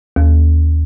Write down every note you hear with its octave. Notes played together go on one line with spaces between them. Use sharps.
D#2